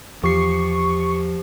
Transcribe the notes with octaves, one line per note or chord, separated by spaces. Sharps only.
E2 F3 G4 C#6 C7